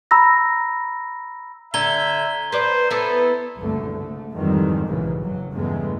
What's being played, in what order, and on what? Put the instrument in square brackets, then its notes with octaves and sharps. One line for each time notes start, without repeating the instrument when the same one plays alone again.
[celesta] A#5 B5 E6 A#6
[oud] D3 [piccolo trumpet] E5 [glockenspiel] A#5 G#6 G7
[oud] B4 D5 [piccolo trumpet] C5
[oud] B3 E4 [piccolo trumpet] A4
[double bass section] F#1 C2 A#2 D3 A3
G#2 A3
F2 G#2 D#3 E3 G3 G#3
B1 G#2 C#3 E3
F#1 F#3
E2 G2 C#3 G#3 A3 B3